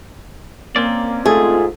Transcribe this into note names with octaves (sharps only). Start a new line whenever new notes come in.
A#3 C4 C#4 D5
G#2 A3 F4 G#4